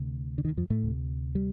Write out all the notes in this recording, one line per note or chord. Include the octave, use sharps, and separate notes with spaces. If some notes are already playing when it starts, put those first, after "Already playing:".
Already playing: D2 C3
D3
D#3
F2 F3
A2 A3
D2 C3
G3